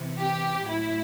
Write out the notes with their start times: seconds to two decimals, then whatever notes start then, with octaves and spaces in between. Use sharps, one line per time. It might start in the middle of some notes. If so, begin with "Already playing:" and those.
Already playing: C3 E3
0.19 G4
0.69 A2 F#3 E4